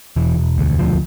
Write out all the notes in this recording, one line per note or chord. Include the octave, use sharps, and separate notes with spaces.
E1 E3
E1
D2
E1 F3